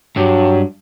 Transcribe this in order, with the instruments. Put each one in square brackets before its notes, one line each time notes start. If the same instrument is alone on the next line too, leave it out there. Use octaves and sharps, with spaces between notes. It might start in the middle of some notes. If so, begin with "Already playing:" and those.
[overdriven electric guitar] G2 [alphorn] F#3